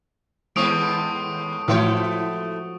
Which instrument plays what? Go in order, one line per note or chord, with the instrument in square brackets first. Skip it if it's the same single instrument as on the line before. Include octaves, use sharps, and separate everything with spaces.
[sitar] D#2 A2 C4 [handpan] G#3 B3 [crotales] C#6 D#6 D7
[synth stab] A2 E3 G5 [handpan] F3 F#4 [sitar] A3 E4 C#5